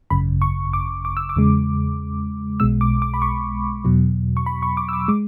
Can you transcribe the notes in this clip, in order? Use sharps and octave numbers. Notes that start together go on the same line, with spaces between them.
G#1 F#2 C#3 B5
C#6
D6
D6
E6
D6
E2 C#3 G#3
B1 B2 G#3 E6
D6
D6
B5
C#6
E2 B2 F#3
C#6
B5
C#6
D6
E6
D6
G#3 D6